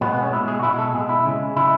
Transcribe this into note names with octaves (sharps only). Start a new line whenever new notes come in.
B2 G#3 B3
B3
C#4
B2 G#3 E4
G#4
F#4
B2 G#3 E4
A4
B2 G#3 G#4
E4
C#3 G#3
C#3 G#3 E4